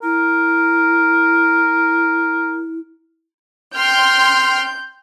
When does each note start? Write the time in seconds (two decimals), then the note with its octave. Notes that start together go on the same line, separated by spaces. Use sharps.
0.03 E4 A#4
3.74 G5 C6 F6 G6